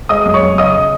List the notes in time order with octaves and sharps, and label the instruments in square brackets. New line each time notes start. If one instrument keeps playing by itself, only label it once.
[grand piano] G#3 D#5 D#6
F#2
C#5 C#6
F#2
C#3 D#5 D#6